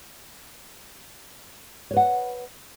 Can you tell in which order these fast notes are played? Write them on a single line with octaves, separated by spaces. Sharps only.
C#5 B4 F#5